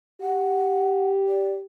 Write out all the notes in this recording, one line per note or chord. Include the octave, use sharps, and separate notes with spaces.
G4 F#5
D5